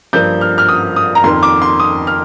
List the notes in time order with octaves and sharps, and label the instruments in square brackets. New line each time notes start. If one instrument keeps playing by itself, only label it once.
[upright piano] G2 F3 A#3 G6
F6
F6
D#6
D#6
A#5
F2 D#3 A#3 C6
D6
C6
D#6
F6